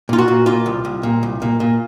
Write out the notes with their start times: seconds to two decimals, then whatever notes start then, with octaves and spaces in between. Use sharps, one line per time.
0.09 A#2 F4
0.18 F#4
0.28 A#2
0.46 A#2 F4
0.66 C2
0.85 C2
1.03 A#2
1.23 C2
1.42 A#2
1.60 A#2